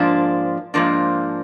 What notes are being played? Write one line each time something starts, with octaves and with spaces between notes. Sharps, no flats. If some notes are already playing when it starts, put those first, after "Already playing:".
Already playing: G#2 F3 A#3 D4
G#2 F3 A#3 D4